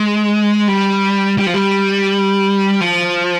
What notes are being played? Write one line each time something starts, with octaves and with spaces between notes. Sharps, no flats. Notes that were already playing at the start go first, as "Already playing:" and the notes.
Already playing: G#3
G3
G3
F3
G3
F3